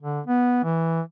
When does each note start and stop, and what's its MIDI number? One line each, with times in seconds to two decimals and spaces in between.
0.02 0.20 50
0.27 0.60 59
0.64 1.01 52